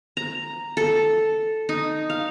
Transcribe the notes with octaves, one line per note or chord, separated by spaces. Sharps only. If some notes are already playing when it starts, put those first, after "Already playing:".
A#5
A4
D#4
F5